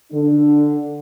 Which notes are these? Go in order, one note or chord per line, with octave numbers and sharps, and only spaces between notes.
D3 D4